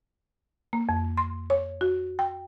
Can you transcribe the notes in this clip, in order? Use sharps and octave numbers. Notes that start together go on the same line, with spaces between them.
A#3
F2
C6
C#5
F#4
G5